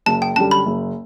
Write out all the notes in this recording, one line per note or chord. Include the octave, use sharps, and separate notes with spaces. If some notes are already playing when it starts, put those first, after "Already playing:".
F#1 A5
G5
F#2 D3 G3 A5
B5
F#1